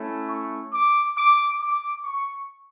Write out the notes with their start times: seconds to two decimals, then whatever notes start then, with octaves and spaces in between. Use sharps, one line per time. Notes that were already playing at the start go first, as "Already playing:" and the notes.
Already playing: A3 C#4 E4
0.29 C#6
0.72 D6
1.17 D6
1.60 D6
2.04 C#6